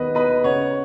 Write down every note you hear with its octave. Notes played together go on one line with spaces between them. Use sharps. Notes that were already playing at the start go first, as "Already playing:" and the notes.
Already playing: D#2 D#3 B3 B4 D#5
B3 B4 D#5
C#3 C#5 F#5